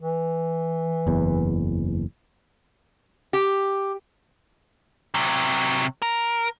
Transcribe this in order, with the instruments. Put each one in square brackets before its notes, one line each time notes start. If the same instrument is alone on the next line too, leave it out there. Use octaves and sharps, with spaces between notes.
[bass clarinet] E3
[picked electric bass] F#1 E2
[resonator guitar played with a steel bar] G4
[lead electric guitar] C3 F#3
A#4